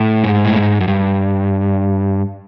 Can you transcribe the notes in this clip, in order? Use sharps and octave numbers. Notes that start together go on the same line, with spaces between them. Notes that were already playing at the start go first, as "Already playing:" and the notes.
Already playing: A2
G#2
A2
G#2
F#2
G2